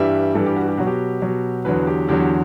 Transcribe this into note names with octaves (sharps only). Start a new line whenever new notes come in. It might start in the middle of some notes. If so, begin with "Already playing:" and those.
Already playing: G2 E3 G3 E5
G2 E3 G3 A4
G4
F#4
G4
B2 F#3 F#4
G4
B2 F#3
E2 D3 F#3 B4
G4
E2 D3 F#3 G4